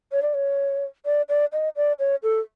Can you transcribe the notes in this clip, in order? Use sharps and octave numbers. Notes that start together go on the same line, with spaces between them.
C#5
D5
C#5
D5
D5
D#5
D5
C#5
A4